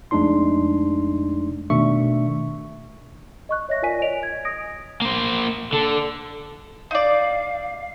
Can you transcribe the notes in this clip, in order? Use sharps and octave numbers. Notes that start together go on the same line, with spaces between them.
F2 G#3 A3 D4 D#4 C6
B2 D#3 A3 D4 E5 C#6
D#5 C#6 F#6
C#5 D#5 E5 A#6
F4 A#4 D5 G#5 B6 D#7
C#5 D#5 G#5 D7 F7
G#6
D#6 A#6 D7
A#3 C5
D3 A4
D#4 D5 F5